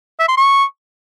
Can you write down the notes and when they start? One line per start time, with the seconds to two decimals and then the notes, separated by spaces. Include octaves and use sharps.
0.20 E5
0.28 C6
0.37 C#6